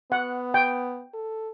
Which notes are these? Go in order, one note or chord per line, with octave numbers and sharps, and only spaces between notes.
B3 F#5
G5
A4